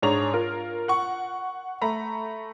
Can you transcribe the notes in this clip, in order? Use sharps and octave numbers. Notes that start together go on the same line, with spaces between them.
G#2 D4 G#4 C#5 A#5 F7
F4 A#4
F#5 C#6
A3 A#5 B5